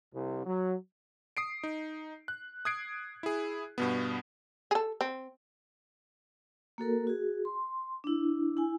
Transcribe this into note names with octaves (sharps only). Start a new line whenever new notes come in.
C2
F#3
D#6 C7 D7
D#4
F#6
D#6 F#6 G#6 C7 D7
E4 G#4
G2 B2 B3
G#4 A4
C4
A#3 F#4 A4 A#4
F#4 G#4
C6
D4 E4
E4 G#5